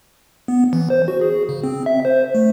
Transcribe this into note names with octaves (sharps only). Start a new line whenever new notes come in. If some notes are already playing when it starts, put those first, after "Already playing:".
B3
E3
C5
F#4
G#4
C#3
C4
E5
C5
A3